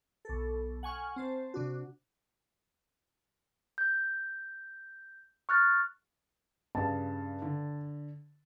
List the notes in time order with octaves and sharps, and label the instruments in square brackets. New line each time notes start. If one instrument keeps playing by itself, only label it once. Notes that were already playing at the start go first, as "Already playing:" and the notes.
[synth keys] B1 A4
F#5 G#5 C#6 F6
C4 C5 A5
C3 D4 F#4
[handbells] G6
C#6 F6 F#6 A6
[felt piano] G2 C#3 [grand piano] A5
[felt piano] D3